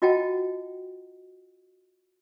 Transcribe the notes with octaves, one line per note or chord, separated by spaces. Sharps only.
F4 F#4 D#5 F#5 G5 A5